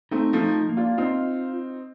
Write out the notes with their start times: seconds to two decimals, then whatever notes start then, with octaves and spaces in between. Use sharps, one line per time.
0.11 A3 C4 D#4
0.33 F3 A3
0.40 D#4
0.69 A#3
0.77 D4 F4
0.98 C4 D#4 F4